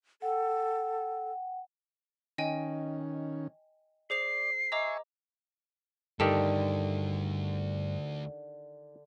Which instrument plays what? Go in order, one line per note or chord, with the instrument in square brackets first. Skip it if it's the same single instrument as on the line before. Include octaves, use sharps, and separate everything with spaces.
[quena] A4 [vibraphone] F#5 G5
[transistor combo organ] D#3 C#4 [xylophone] D#5 G5 G#5
[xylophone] G#4 C5 F7 [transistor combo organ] D5 [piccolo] C7
[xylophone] D#5 A#5 D6 [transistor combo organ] E5 G#5 C#6
[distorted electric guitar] D2 [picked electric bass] G2 [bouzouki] D3 [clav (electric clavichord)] D#3 G4 A4